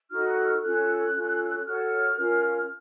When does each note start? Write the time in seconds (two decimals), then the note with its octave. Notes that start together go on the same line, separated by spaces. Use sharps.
0.11 D#4 F#4 A4 F6
0.28 F#6
0.46 F6
0.62 C#4 F4 A4 F#6
1.14 C#4 F4 A4
1.65 F#4 A4 C#5 F6
2.17 C#4 F4 A#4